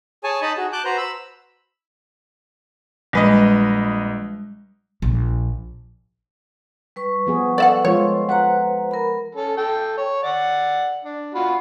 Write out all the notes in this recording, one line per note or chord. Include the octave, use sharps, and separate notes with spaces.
G#4 C#5 G#5 A5
D#4 D#5 A5 B5
F#4 G#4
A5 D6 F#6 G6
F#4 B4 C5 A#5
B5 E6
A#1 G3 G#3 B4 D#5
A#1
G3 B4 C#6
F3 B3 G#4
A4 D5 E5 F#5
F3 G#3 F4 C#5
B4 C5 F#5 A#5
A#4 B5
C#4 A4
A4 G5
C#5
D5 F#5
D4
F4 F#4 B5